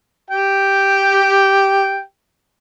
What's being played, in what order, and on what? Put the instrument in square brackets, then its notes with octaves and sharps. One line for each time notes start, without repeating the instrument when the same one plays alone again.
[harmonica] G4 G5